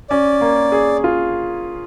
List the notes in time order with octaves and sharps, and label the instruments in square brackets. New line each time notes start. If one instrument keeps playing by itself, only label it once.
[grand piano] C#4 [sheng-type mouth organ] D5
[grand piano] A#3
G#4
F4